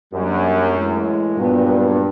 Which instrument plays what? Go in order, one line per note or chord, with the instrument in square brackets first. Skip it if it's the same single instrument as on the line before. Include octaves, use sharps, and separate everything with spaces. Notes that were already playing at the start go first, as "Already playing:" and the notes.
[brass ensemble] F#2 [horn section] G3 A#3 D4
[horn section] A2 E3 G#3
[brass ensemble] G2 [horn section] A#2 F#3 B3 D4